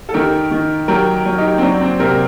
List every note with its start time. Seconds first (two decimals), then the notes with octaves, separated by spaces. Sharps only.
0.09 A4
0.14 D#3 G4 A#4
0.51 D#3
0.88 F#3 G4 A#4
1.25 F#3
1.38 D#4 G4
1.58 C4
1.62 F#3 D4
1.81 C4
1.99 C3 G4 A#4